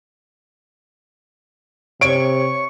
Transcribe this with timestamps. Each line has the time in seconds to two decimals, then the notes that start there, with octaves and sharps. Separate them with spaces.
2.01 C3 C#5 C#6 D7